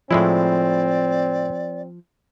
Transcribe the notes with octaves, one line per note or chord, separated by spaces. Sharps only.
A2 F3 G#3 C4 E4 D5